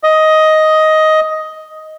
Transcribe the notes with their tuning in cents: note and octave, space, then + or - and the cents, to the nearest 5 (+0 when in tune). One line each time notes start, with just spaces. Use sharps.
D#5 +10